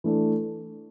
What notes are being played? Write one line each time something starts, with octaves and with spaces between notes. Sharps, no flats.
E3 A3 D4